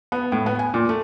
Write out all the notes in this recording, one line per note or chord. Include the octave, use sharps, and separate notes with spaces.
B3
A2
B3
G#5
A#2
A3